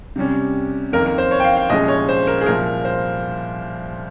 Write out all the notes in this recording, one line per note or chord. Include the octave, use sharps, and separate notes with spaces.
C3 G3 C#4
F2 D#3 A#3 A#4
A#4
C5
C#5
G5
F5
F5
C2 A#2 F3 G#3 C#4 D#5
C#5
C5
A#4
G#4
C2 A#2 F3 A#4
C5